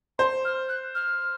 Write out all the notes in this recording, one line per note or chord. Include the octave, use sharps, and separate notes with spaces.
C5 C6
F6
F#6
F6